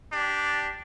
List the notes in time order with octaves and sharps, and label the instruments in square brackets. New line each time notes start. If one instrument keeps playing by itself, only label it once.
[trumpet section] D4 G4